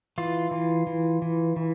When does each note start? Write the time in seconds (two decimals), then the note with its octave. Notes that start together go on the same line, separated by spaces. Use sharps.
0.18 E3 F4
0.51 E3
0.87 E3
1.22 E3
1.56 E3